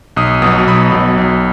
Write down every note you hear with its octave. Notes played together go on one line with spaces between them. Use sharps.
B1 D#6
B2 F#3 D#6
B1 B5
B2 F#3
B1